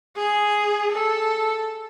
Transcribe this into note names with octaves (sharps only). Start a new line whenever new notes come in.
G#4
A4